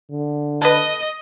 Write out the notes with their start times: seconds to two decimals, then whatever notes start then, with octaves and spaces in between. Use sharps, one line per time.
0.11 D3
0.62 A4 B4 D#5